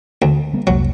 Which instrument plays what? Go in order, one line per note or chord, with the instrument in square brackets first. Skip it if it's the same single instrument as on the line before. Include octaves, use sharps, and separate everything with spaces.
[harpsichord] D2
[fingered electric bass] G3 A#3 B3
[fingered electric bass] F1 C2 A#3 [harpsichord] F#3